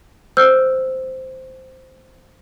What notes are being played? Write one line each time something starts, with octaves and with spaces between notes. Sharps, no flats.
C5 E6 F6 G6